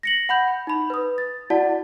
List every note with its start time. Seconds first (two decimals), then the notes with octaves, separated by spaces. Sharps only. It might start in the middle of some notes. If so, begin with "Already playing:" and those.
0.03 A#6 C#7 F#7
0.29 F#5 B5 G6
0.67 D#4 B5
0.90 B4 D#6
1.18 A6
1.50 E4 F#4 D5 F#5 A5